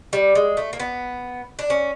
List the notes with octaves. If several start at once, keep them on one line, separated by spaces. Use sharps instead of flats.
G3
G#3
A3
A#3
B3
D4
C#4